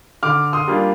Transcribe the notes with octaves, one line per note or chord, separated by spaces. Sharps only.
D3 D6 F6
C6 D#6
G3 A#3 D4 F4